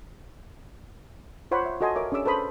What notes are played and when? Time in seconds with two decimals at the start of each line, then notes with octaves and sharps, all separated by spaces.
1.51 F4 C5 C#5 F#5 B5
1.66 E5
1.81 F#4 A4 D#5 G#5 C6
1.96 A#4 C#5 E5 D6
2.12 C#4 D4 G#4 D6 E6
2.26 A4 B4 C5 B5 D#6